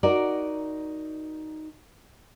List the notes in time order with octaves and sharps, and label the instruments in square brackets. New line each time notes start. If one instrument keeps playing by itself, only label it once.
[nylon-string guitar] D#4 F#4 A#4 D5